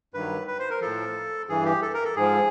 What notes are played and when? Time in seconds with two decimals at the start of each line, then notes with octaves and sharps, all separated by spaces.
0.14 G2 D#3 F#3 B4
0.48 B4
0.59 C5
0.70 A#4
0.81 A2 F3 A4
1.49 G2 E3 G#4
1.65 G4
1.82 A4
1.94 A#4
2.05 A4
2.16 G#2 F3 G#4